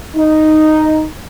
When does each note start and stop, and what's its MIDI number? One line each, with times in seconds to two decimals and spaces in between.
0.16 1.06 63